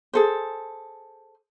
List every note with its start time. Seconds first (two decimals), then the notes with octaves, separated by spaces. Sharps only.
0.13 G#4 A4 C5